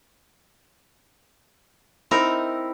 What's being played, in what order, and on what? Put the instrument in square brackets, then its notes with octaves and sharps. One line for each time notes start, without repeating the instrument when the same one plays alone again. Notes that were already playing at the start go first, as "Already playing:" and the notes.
[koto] C4 D#4 A#4 [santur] E4